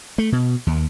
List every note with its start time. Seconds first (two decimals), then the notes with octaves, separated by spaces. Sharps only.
0.18 A3
0.32 B2
0.67 D#2